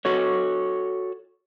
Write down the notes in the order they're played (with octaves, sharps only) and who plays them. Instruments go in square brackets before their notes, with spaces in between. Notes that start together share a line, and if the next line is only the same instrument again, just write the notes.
[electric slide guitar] F#4 A4 C#5